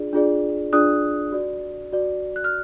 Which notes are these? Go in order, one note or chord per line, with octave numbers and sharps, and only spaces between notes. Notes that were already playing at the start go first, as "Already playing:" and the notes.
Already playing: D4 F4 G#4 D5
D4 F4 G#4 D5
D4 F4 G#4 D5 D#6 F#6
F#4 D5
F#4 D5
F#6
F6